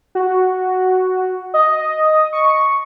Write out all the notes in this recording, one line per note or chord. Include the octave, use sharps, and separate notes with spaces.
F#4
D#5
C#6